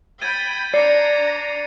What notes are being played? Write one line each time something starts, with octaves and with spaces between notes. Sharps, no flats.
G5 B5 G#6 A6 D#7
D4 D5 A#5 C7 C#7 D#7